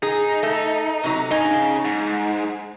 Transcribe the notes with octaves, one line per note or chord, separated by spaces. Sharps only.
D#4 G#4
A3
C3 F#3
C#3 D#4 G#5
G#2